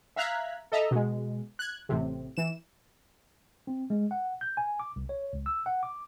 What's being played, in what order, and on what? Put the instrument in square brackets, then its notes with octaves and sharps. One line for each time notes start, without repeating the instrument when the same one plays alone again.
[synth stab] E5 F5 A#5 F#6 G#6 B6
A4 D#5 E5 A#5
B2 G#3
F#6 G#6
A1 A2 C3
E3 E7
[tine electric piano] C4
G#3
F#5
G6
G#5
D6
C2
C#5
C#2
E6
F#5
D6